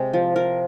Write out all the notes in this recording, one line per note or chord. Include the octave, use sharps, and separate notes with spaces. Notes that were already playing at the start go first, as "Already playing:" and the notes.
Already playing: C3 G#3
F3
F3 A#4